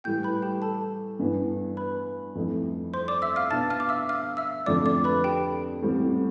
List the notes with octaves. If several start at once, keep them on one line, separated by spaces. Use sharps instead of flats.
A2 E3 G3 G5 G6
B4 B5
G4 G5
A4 A5
G2 E3 B3
B4 B5
F2 E3 A3 E4
C5 C6
D5 D6
E5 E6
F5 F6
B2 B3 D4 A5 A6
F5 F6
D6
E5 E6
F5 F6
E5 E6
F2 D3 A3 D4 F4 D5 D6
D5 D6
B4 B5
G4 G5
A1 A2 G3 C4